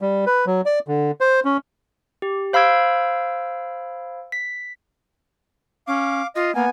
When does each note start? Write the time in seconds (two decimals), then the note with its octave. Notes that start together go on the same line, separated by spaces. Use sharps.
0.01 G3
0.27 B4
0.47 F#3
0.66 D5
0.88 D3
1.21 C5
1.45 C#4
2.22 G4
2.53 C5 F5 B5 E6 G#6 D7
4.32 B6
5.88 C#4 F5 D6
6.36 F4 D#5
6.55 A#3 B3 G#5